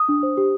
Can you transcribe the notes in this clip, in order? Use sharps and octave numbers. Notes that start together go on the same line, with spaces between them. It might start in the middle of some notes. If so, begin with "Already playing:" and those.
Already playing: D#6
D4
C5
G4